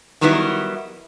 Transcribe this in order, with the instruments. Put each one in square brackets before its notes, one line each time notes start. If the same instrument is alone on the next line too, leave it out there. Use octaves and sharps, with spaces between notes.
[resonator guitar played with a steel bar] D#3 F#3 G3 B3 D4 E4